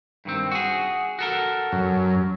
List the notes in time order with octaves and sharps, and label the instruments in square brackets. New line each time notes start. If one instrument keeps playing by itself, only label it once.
[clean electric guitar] G2 D#3 C4
F#4 G#4
F#4 A4 A#4
[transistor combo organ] F#2